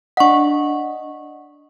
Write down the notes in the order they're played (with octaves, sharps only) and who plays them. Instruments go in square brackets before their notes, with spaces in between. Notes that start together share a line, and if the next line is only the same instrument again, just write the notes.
[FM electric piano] D4 D#5 [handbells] F#5 C#6